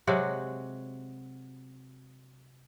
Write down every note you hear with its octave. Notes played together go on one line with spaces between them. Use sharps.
C3 F#3 G#3 F#4